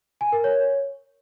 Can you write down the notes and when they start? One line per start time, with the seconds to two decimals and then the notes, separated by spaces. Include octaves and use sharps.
0.21 G#5
0.32 A#4
0.44 C#5